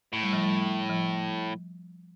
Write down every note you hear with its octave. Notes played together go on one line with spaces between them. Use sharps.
A2 A3
G3
F3
G3
F3